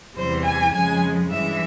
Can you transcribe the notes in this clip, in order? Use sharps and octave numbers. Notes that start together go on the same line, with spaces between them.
E2 C3 E3 G3 C5
G#5
F2 C#3 F3 G#3 G#5
G2 E3 G#3 E5